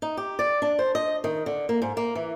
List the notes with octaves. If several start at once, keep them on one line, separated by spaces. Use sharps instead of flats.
D#4
G4
D5
D4
C5
D#5
D#3
D3
A#3
G#2
A#3
E3